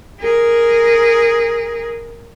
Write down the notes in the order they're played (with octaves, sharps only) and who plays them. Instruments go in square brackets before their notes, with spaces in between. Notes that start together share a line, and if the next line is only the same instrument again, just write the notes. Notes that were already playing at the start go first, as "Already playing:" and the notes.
[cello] G#4 A#4